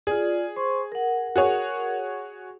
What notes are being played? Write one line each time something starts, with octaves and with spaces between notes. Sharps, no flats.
F4 G#4 D5
C5 C6 C#6
A#4 F#5
F#4 G#4 C#5